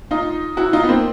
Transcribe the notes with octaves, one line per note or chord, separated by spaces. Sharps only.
D#4 F4
E4 F#4
D#4 F4
B3
A#3 C4